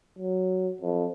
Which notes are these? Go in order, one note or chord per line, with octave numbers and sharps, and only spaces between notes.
F#3
F2